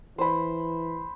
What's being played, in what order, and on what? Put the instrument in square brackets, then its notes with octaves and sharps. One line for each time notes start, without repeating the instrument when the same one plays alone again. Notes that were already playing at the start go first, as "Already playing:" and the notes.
[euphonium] E3 [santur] C5 B5